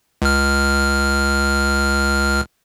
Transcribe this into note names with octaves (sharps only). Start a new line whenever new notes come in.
C#2 F6